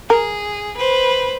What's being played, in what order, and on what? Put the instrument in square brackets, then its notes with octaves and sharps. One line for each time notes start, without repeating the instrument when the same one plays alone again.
[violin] G#4 [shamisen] A#4
[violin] B4 C5